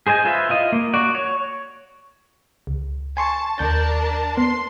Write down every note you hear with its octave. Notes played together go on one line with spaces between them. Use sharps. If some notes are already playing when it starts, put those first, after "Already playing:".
G#4 C5 D#5 G#5
F4 B4 C5 E5
E4 F4 D#5
A#3
F#4 D5
C#5
C#2
G#5 A5 C6 C#6
D#2 D4 A#4 A5 G6 A6
B3 C6